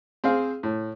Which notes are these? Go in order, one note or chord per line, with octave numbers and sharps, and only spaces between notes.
C4 G#4 C5 F5
A2